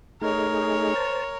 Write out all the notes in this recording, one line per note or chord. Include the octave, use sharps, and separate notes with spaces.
A3 D#4 G#4 A#4 C#5
C5 A5